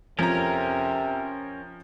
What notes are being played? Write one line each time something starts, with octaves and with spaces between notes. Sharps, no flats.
F2 C3 F3 C#4 A#4 A#5